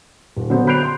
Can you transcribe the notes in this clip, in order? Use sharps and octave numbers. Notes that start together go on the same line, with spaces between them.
D#1
D3 F#3 B3 F#4 C5
B5 F#6 G6 C7 D7 F7
C6 G6